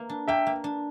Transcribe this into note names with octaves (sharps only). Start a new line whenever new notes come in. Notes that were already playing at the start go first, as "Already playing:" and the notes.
Already playing: A#3
D4
A#3 E5 G5
A#3
D4